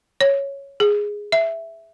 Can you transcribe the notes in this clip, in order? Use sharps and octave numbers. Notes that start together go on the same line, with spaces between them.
C#5
G#4
E5